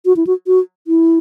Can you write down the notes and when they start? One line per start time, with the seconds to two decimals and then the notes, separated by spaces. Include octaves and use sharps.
0.06 F#4
0.16 E4
0.27 F#4
0.47 F#4
0.87 E4